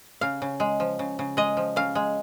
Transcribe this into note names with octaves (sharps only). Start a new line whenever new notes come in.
C#3 F5
C#3
G#3
F3
C#3
C#3
G#3 D#5
F3
C#3 F5
G#3